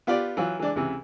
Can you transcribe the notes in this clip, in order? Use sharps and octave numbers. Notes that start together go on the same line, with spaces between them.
B3 F4 G4 D5
E3 F#3 F4
E3 G#3 D4 D5
C#2 C3 E3